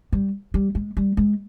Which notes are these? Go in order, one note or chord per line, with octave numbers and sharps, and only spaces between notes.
G3
G3
G#3
G3
G#3